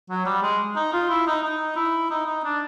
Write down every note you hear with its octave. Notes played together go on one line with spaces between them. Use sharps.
F#3
G3
G#3
D#4
F4
E4
D#4
D#4
E4
D#4
D#4
D4